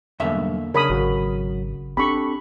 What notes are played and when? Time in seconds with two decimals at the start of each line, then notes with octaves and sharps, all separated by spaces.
0.20 B1 E2 G2 D3 A#3 E5
0.74 C#3 D4 A#4 C#5 B5 D#6
0.90 G#1 F#3 F#4
1.97 C4 D4 G4 A4 B5 C#6